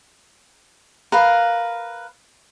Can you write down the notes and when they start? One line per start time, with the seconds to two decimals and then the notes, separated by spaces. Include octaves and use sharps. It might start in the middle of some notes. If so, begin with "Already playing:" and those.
1.12 A#4 B4 F5